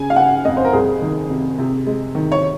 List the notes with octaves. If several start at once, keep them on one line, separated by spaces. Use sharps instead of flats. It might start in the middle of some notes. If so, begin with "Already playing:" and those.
Already playing: C#3 G#5
F5
C#3 F#5
F2 D#5
C5
A#4
C2 G#4
D#3
C3
C3
G#3
D#3
C#5